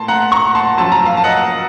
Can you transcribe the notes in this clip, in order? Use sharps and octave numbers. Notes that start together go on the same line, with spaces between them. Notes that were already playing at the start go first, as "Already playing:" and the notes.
Already playing: A2 A5 C6
F#5 A#5
A#5 C#6
A5 C6
F#2 F3 A5
A#5
F5 A5
A5
D#5 F#5